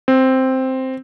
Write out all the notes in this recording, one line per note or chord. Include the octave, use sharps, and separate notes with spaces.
C4